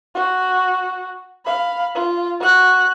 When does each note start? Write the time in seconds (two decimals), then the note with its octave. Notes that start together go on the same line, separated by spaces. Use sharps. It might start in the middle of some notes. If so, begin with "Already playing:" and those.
0.15 F#4
1.45 F5 B5
1.95 F4
2.40 F#4 F#6